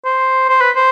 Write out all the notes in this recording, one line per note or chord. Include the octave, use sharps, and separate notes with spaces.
C5
C5
B4
C5